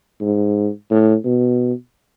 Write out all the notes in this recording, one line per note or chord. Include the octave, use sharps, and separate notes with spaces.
G#2
A2
B2